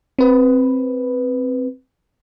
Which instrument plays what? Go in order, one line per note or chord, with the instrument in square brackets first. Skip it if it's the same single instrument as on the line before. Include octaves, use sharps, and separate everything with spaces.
[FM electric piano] C4 B4